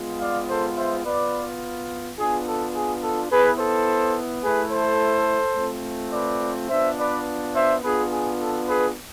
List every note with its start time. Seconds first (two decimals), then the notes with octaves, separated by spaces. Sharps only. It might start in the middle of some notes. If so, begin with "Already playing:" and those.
Already playing: G#3 B3 F4
0.20 D5 F5
0.48 A4 C5
0.76 C5 E5
1.05 B3 F4 B4 D5
2.17 B3 D4 F4 G#4
2.47 A4
2.75 G#4
3.02 A4
3.31 B3 E4 G#4 B4
3.58 A4 C5
4.43 A3 E4 G#4 B4
4.72 A4 C5
5.57 A3 C4 F4
6.13 B4 D5
6.69 B3 D4 F4 C5 E5
6.98 B4 D5
7.54 C5 E5
7.82 B3 D4 F4 G#4 B4
8.12 G#4
8.40 A4
8.67 G#4 B4